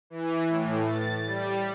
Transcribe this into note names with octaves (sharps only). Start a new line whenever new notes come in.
E3
A2
A6
G3